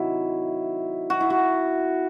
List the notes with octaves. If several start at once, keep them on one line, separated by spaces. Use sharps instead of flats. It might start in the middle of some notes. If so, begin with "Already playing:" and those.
Already playing: C3 D#3 F#3 E4
F#4
E4
F#4